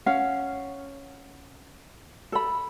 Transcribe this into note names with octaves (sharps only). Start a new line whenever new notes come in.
C#4 F5 F#5
A4 B5